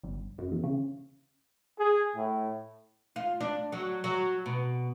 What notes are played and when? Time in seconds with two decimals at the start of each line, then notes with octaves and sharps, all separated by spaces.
0.03 G1
0.38 F#2
0.51 E2
0.64 C#3
1.78 G#4
2.15 A2
3.16 F4
3.41 D4
3.72 F#3
4.04 F#3
4.46 B2